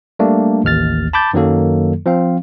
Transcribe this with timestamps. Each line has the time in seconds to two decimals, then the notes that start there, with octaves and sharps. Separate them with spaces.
0.19 G3 A3 A#3 D4
0.64 A1 D#2 F6 A6
1.13 A5 B5 D6 G6 A6
1.34 F#2 D#3 F#3 A#3 A4
2.06 F3 C4 F5